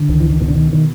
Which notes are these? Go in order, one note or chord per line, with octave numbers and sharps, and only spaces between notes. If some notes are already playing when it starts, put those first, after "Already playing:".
Already playing: D3
C#2 D#3
E3
D#3
B2 D#3
D3
D#3
D#3